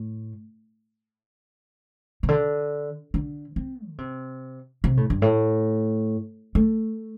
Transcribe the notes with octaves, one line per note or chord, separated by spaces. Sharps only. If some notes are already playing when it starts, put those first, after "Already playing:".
Already playing: A2
C3
D3
D3
C4
D3
C3
C3
A2
G2
A2
A3